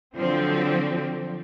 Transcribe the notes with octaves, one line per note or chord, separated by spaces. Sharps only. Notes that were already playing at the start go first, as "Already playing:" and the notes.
D3 F3 F#3 C4